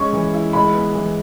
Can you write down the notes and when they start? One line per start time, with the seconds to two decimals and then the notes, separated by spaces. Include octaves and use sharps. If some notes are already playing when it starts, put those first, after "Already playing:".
Already playing: G#3 C#4 C#6
0.13 E3
0.34 E4
0.53 G#3 B5
0.74 B3
0.95 E3